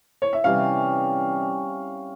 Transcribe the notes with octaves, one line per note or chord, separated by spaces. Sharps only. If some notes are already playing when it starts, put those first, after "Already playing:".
C#5
E5
C3 E3 G3 C#4 F5